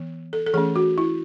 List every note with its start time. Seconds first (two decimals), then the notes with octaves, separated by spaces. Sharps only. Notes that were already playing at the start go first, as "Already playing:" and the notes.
Already playing: E3 B3
0.33 A4
0.47 A4
0.53 E3 A3 C#4 G#4
0.76 F#4
0.98 E4